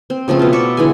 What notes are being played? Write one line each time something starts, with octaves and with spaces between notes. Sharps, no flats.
C4
C#3 F3 A3 C4
B2 F4
D5 E5 C#6
D3 E3 G#3 G#5